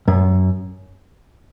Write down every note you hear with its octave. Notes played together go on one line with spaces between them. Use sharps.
F#2